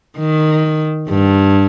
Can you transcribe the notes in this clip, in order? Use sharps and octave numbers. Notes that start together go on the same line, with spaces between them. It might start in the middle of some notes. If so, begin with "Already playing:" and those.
D#3
G2